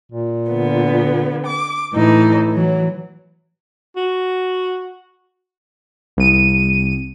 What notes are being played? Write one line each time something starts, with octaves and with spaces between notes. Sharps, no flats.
A#2
D3 B3
D6
A2 E3 D#4 E4
E3 F#3
F#4
C2 D#7